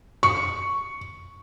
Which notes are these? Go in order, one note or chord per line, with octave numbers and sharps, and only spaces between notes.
C#6